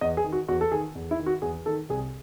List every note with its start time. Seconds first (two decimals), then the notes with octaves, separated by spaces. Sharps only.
0.01 E2 D#5
0.17 G#4
0.24 D#3
0.32 F#4
0.48 E2 F#4
0.61 A4
0.72 D#3 G#4
0.95 E2
1.11 E4
1.19 D#3
1.26 F#4
1.42 E2 G#4
1.66 D#3 A4
1.89 C2 G#4